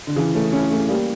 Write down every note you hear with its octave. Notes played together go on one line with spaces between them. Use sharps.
D3
C#3 E3
A3 C#4
C#4 E4
A3 C#4
G3 A#3